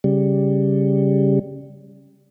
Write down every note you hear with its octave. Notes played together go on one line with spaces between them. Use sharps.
C#3 G3